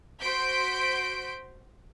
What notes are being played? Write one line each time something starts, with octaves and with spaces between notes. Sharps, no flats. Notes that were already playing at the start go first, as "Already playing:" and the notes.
F#4 C5 C6 G6 B6 D7